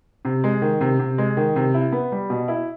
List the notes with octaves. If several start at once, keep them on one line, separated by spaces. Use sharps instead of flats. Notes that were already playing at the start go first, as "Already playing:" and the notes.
C3
G#3
D#3
C3
C3
G#3
D#3
C3
E4
B3
G3
B2
E4